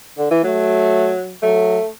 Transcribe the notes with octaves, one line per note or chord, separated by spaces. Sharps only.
D3
E3
F#3 A3
F#3 A3